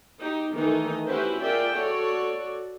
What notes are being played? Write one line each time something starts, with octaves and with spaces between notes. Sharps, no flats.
D#4 G4
D#3 E3 A3 D#4
C#4 E4 F#4 G4 B4 C5
F4 G#4 A#4 D5 E5 G5
F#4 A4 C#5 D5